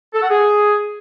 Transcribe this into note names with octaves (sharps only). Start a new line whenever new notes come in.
A4
F#5
G#4